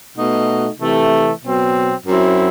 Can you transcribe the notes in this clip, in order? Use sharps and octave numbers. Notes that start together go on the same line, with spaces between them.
B2 A3 D#4 F#4
C3 E3 A3
B2 F#3 C4
F#2 F#3 C4 E4